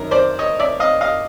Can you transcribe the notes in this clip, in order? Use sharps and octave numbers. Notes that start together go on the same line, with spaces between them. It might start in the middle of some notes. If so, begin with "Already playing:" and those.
Already playing: F#2 D#3 A#4
C5 D5
C#5 D#5
D5 E5
D#5 F5
D#5 F5